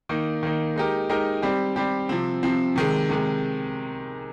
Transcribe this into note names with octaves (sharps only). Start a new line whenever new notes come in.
D#3 A#3 D#4
D#3 A#3 D#4
G#3 D#4 G4 A#4
G#3 D#4 G4 A#4
G3 C4 G4
G3 C4 G4
C3 F3 C4
C3 F3 C4
C3 D#3 G#3
C3 D#3 G#3